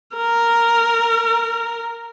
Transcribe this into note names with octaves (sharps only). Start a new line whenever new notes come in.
A#4